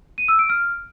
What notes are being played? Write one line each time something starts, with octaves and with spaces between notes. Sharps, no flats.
D#7
E6
D7
F6